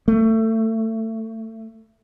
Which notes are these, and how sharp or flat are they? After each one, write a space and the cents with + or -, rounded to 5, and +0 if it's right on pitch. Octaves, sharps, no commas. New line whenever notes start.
A3 +25